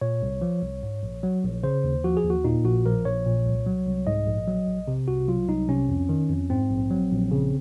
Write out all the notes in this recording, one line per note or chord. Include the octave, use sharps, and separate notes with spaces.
A#2 C#5
C2
F3
C2
G#2
A#1
F#3
A#1
C#3 C5
D#2
F3 F#4
G#4
D#2
F#4
A#2 D#4
A#1 F#4
F3 A#4
A#1 C#5
A#2
C2
F#3
C2
G#2 D#5
A#1
F#3
A#1
C3
C2 F#4
F#3 F4
C2 D#4
C3 C#4
F2
D#3
F2
G#2 C4
A#1
F#3
A#1
C#3